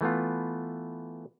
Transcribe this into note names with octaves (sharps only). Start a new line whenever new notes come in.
E3 A3 B3 F4